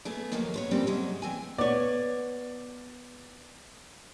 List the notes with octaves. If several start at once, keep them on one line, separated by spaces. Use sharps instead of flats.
A3 B3 G#4
D#2 F3 F#3 G#3 A#3
B3 C5 C#5
A#2 C#3 F3 G3 A#3 C4
C3 F#3 G#3
E3 C4 G#5
B3 C#5 D5